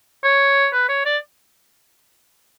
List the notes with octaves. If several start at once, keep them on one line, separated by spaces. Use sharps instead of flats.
C#5
B4
C#5
D5